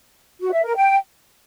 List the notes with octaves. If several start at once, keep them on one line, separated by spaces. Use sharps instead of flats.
F#4
E5
A#4
G5